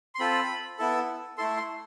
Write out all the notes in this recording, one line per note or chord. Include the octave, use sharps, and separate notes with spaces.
C6
C4 F4 A4 B5
B3 E4 A4
A3 E4 A4 C6
C6